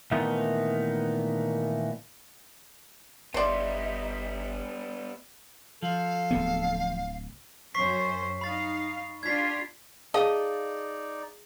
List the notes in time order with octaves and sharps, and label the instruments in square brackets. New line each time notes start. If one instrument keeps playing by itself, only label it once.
[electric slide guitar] A#2 D#3 E3 A3 B3 D#4
[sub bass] G1 [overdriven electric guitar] G3 B3 [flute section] D#4 E5 [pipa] C5 D5
[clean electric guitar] F3 [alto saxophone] A4 [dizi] F5
[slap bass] D1 D3 B3
[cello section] F#2 C#4 C5 [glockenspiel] C#6 B6 C7
[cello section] D#4 F5 [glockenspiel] B5 A6
[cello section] D4 F4 G4 [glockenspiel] G#6 B6
[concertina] D#4 D5 [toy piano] G#4 F5 A5 [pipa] D#5